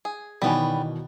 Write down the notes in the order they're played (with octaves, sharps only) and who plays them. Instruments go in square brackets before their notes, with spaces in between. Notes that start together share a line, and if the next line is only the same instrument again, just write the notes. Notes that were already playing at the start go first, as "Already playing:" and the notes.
[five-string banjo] G#4
[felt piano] B2 D#3 E3 [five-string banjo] G3 B3 C#4